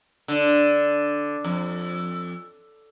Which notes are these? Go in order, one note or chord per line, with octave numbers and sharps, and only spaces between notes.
D3
F2